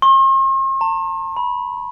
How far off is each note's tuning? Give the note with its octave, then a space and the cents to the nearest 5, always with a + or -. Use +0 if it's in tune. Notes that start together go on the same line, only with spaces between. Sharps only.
C6 +45
A5 +45
B5 -20